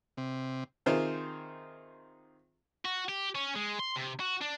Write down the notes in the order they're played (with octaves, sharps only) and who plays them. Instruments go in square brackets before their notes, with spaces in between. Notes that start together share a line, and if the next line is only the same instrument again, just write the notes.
[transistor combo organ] C3
[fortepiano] C3 D#3 F4 G#4 C5
[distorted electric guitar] F#4
G4
C#4
G#3
C6
C3
F#4
D4